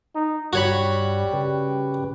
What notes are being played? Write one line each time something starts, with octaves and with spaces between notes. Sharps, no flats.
D#4
G2 G3 F#4 C#5 B5
C#3 G4 B4